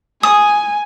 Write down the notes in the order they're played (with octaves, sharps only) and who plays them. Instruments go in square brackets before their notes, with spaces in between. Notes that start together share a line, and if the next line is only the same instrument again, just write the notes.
[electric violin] G#5 [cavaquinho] D#6